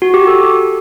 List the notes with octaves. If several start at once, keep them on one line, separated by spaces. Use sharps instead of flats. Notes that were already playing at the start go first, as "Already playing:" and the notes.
F#4
G4
A4